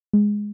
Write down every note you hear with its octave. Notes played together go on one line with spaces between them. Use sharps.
G#3